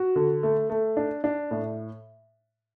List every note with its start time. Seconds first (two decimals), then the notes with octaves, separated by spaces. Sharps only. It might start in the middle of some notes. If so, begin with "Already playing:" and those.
Already playing: F#4
0.16 D3
0.43 A3
0.70 A3
0.97 D4
1.24 D4
1.51 A2